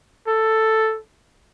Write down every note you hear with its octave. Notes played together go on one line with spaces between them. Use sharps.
A4